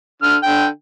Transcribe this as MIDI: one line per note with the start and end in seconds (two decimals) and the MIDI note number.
0.22 0.36 50
0.22 0.36 89
0.43 0.66 50
0.43 0.66 79